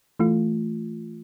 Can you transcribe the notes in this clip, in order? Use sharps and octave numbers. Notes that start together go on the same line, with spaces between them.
E3 A3 F4